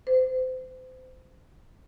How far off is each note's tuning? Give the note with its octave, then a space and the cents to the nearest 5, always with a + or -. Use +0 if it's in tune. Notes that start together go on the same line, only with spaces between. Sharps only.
C5 -30